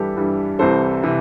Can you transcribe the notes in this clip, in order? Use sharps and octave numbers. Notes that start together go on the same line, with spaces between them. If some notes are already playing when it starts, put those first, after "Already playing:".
Already playing: G2 E3 G3 G4 A4 B4
G2 E3 G3
C2 C3 E3 A4 C5
C3 E3